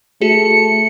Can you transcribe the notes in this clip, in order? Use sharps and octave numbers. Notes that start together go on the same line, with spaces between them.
A3 F#4 G#4 C#7